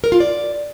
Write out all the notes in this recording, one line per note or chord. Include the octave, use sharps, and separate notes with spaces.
A#4
F4
D5